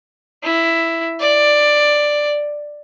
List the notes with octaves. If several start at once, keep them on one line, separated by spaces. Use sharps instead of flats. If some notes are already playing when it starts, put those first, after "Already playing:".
E4
D5